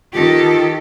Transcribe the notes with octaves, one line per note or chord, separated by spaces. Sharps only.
D#3 F4 G4 A4